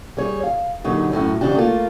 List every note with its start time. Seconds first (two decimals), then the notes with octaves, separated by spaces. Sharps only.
0.17 G3 G#4 C#5
0.44 F5
0.84 A#2 D3 F#3 D#4 G4
1.12 F#2 A2 F#3 C#4
1.41 G#2 C#3 E3 D4 G4
1.55 A3 A#3 F4